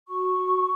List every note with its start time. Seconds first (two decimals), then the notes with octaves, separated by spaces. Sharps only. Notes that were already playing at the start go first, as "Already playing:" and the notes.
0.08 F#4 C#6
0.37 F#4